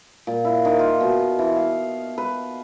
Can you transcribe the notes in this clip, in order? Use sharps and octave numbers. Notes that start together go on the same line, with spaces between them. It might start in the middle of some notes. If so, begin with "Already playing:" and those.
A#2
E4
D#3
F4
B2
E3
F5
B4